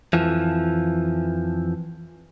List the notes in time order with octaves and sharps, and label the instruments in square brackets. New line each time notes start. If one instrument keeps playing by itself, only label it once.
[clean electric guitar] F2 E3 F3